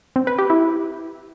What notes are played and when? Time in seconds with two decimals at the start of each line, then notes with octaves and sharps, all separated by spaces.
0.16 C4
0.27 B4
0.38 G4
0.50 E4